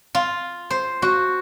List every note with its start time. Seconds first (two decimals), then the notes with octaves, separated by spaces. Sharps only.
0.15 F4
0.70 C5
1.02 F#4